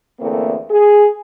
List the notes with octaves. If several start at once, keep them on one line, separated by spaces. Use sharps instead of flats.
E2 D3 A3 A#3 C4
G#4